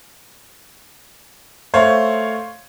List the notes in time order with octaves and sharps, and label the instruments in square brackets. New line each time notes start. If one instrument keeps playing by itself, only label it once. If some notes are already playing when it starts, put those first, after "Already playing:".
[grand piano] A3 C5 C#5 F5